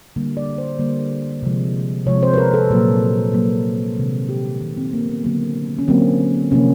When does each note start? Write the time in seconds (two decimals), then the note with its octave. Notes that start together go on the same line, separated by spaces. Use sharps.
0.16 D3 G3 A#3
0.37 D5
0.58 C5
0.79 D3 G3 A#3
1.43 C3 F3 G#3
2.06 C3 F3 G#3 C#5
2.23 C5
2.34 B4
2.38 A#4
2.54 A4
2.70 A#2 F#3 A#3
3.33 A#2 F#3 A#3
3.97 C3 D#3 G#3
4.29 G4
4.61 C3 D#3 G#3
4.77 C4
4.93 A#3
5.09 B3
5.24 D3 F#3 A#3
5.79 C#4
5.88 D3 F#3 A#3 C4
6.51 C3 F3 A#3 C#4